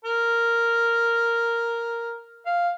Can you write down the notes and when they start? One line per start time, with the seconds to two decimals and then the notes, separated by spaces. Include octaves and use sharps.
0.05 A#4
2.46 F5